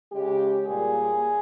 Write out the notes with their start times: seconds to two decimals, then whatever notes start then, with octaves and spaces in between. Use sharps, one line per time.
0.12 C#3 G#3 G4
0.67 A#2 G3 A#3 G#4